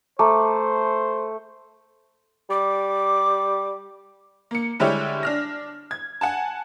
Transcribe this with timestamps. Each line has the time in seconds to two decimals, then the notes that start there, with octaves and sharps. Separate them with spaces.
0.19 A3 C5 A5 A#5 D6
2.50 G3 D6
4.51 A#3 C#7
4.80 D3 G3 G#3 E4 G4 C#5
5.23 D4 F6 A#6
5.91 G#6
6.21 F#5 G#5 A5